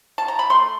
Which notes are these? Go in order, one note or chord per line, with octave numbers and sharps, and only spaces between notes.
A5
A#5
B5
A3 C6